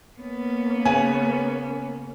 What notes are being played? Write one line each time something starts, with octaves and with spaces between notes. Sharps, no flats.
A#3 B3 C#4
C#3 B4 G#5